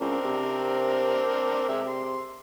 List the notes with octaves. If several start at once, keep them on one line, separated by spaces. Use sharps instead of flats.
C#2 C4 D4 A#4
C3
C3 G#3 G4 E5
C6